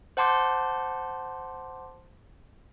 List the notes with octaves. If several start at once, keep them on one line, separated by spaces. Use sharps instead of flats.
C5 F#5 A5 C6 D6 G6